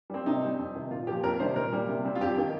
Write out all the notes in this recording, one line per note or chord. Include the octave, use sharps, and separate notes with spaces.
G3 A#3 C4
C3 D#4
G3 C4
F2
C3 D#3
A#2 F4
F3 A#3 G4
F2 A#4
C3 D#3 G3 C5
A#2 A#4
G3 A#3
C3
G3 C4
F4
F2 G4
D#3 A#3